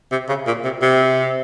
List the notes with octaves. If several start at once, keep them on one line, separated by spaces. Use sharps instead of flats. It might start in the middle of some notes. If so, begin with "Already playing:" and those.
C3
C#3
A#2
C3
C3